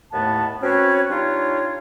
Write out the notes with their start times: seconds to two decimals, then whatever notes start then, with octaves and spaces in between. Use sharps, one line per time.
0.12 D#2 A2 A3 B3 A5
0.62 C4 C#4 F#4 B4 C#5
1.09 G3 D4 D#4 F4 C#5